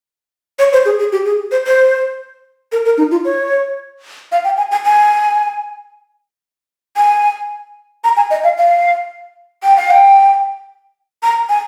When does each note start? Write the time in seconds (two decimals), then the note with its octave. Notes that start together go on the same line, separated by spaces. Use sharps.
0.59 C#5
0.73 C5
0.85 G#4
0.99 G#4
1.12 G4
1.25 G#4
1.51 C5
1.66 C5
2.72 A#4
2.85 A#4
2.98 D#4
3.11 F4
3.25 C#5
4.32 F5
4.44 G5
4.57 G#5
4.71 G#5
4.85 G#5
6.97 G#5
8.04 A#5
8.17 G#5
8.31 D#5
8.44 F5
8.58 F5
9.64 G5
9.77 F5
9.91 G5
11.23 A#5
11.49 G#5